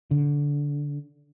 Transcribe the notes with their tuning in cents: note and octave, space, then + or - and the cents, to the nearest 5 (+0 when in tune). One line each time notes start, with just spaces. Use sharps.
D3 -15